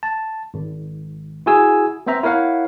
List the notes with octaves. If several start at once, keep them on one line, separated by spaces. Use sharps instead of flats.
A5
G#1
E4 F#4 G#4 G#5 E6
B3 C4 C5 E5 A#5
E4 A#4 C#5 F5 F#5